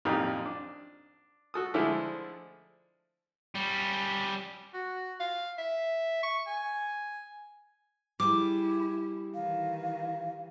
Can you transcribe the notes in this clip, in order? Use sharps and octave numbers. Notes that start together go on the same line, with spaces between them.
A1 F2 A#2 D#4 G4
D4
F#4 A4 D#6
D3 F3 G#3 A3 D4 E4
G3 C#4
F#4
F5
E5
C#6
G#5
G3 E4 G#4 D6
D#3 E3 F5